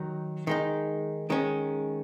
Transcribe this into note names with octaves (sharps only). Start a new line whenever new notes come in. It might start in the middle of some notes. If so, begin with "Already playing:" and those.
Already playing: D#3 F#3 D#4
D#3 G#3 D#4
D#3 G#3 C#4